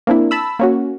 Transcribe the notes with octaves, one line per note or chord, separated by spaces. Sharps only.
A#3 C4 D4 E4
A5 B5 E6
A#3 C#4 F#4